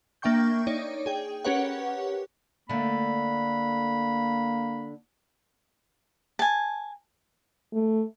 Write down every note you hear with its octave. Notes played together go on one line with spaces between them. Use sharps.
A#3 D4 E5 G5 C#6 G6
D#4 C#5 D5
G#4 G5
C#4 G4 A#4 B4 C#5 F#5
D3 A3 A#3 B5
G#5 A5
A3